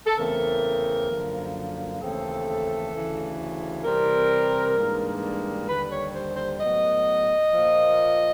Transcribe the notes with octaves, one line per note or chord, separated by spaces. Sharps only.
A4
E2 C#3 E3 A3 C4 A#4
F#2 D3 F3 A#3
D#2 C#3 E3 A3 C4 A4
D2 C#3 E3
C3 E3 G3 C4 A#4
G#2 E3 G3 A#3 D4
D#2 D3 G3 B4
C#5
C5
C5
A2 F#3 B3 D#5
A#2 F3 A#3